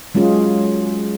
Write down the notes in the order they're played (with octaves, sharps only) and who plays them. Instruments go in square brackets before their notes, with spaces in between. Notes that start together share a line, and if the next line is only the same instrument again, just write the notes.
[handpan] F#3 G#3 C#4 F4 G#4